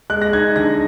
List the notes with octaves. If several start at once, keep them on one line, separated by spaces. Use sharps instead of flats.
G#3 F#6
A#6
D#4 G#6
D3 A#6